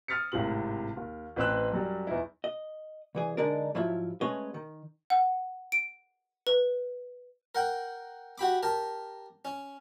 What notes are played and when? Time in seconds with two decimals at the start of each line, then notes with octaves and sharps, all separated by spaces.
0.08 D#6 F6 A6 B6 C#7
0.32 G#1 A2 C3 F#7
0.97 D#2
1.36 A1 C4 B4 G5 E6 F#6
1.72 F#2 F#3 G3
2.07 E2 D#4 E4
2.44 D#5
3.15 C2 E3 G#4
3.37 D3 G#3 D4 D#4 A#4
3.74 G#2 F3 F#3 E4 F4 E5
4.21 G#3 A3 C#4 B4 C#5 D#5
4.54 D#3
5.10 F#5
5.72 D7
6.47 B4
7.55 A#4 F#5 G5
8.38 F#4 G4 B5 D6
8.63 G4 A#4 A5
9.45 C#4